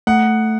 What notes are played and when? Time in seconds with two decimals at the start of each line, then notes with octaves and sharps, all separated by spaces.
0.07 A3 F#5